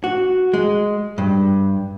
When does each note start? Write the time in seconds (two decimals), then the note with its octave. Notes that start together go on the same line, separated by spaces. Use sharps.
0.04 F#4
0.53 G#3
1.18 G2